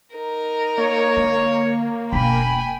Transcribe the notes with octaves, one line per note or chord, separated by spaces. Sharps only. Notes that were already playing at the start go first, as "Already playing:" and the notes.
D#4 A#4
A#3 C#5
D3
E1 B2 G5 G#5 B5